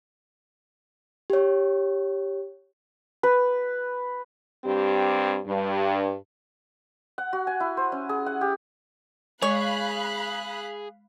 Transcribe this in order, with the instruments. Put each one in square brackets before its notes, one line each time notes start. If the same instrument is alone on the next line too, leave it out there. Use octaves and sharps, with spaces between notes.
[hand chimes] G4 C#5
[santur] B4
[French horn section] G2 C4 G4
G2
[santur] F#5
F#4
G#5
E4
C5
C#4
G#4
F#5
G4
[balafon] G#3 [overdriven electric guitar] G#4 [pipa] C#5 [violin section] F5 B5 F#6